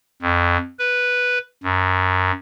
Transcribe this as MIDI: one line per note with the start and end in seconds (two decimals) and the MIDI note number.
0.22 0.57 41
0.79 1.38 71
1.63 2.31 42